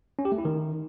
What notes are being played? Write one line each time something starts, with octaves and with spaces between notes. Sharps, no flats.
C#4
G4
A3
E4
D#3